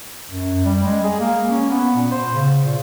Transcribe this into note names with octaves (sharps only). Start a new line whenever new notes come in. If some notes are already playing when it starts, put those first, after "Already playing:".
F#2
G3
G#3
G#4
A#3
C#4
B3
A#2
C5
C#3
A#2